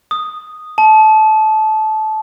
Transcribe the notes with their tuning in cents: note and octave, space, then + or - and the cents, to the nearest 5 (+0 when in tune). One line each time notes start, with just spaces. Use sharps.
D#6 -5
A5 -20